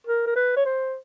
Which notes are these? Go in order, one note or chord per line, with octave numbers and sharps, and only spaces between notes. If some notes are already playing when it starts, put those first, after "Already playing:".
A#4
A#4
B4
C#5
C5